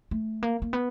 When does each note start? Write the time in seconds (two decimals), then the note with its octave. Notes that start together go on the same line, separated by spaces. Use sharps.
0.11 A3
0.43 A#3
0.62 A#3
0.73 B3